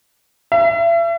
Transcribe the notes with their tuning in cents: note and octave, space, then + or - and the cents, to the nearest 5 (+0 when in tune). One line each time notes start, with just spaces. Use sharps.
E5 +40